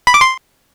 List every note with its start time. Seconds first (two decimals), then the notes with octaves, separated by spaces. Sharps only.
0.07 B5
0.14 D6
0.21 C6